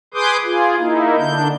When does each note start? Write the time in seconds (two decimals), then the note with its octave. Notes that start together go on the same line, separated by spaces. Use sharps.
0.14 G#4 B4 C6 D6 D#6 G6
0.44 F4 G#4
0.79 A#3 D#4 E4
1.18 D3 D4 G6